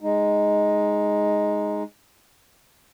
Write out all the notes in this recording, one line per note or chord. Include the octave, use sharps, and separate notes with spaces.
G#3 D#4